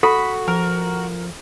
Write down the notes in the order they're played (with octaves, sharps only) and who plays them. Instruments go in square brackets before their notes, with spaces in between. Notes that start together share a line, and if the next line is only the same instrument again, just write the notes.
[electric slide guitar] F#4 [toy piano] A4 [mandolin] B5
[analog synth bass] F3 [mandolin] A#4